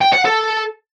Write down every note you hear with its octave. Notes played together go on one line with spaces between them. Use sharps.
G5
F#5
A4